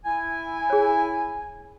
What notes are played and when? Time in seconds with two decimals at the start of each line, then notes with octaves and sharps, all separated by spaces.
0.05 E4 G#5
0.70 G#4 C#5